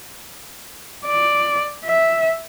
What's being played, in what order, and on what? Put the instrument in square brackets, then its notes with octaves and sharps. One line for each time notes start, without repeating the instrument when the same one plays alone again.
[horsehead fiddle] D5
E5